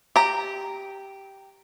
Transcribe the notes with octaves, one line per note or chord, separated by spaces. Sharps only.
G4 A#5